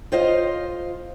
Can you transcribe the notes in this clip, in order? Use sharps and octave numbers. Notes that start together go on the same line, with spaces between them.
F4 C5 D#5 F5